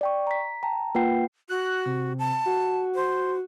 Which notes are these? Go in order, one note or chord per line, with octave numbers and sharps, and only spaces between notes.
D5 G5 C#6
A#5 B6
G5 A5 A#5
A#3 F4 B4 F#5 G5 C7
F#4 F#6
C3
A5
F#4
C5